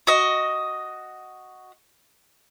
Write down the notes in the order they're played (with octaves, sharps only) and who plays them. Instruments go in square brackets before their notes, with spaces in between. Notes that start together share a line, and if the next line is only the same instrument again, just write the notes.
[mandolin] F#4 D#5